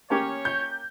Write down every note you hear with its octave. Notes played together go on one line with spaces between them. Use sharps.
A#3 C#4 G4 C#5
G6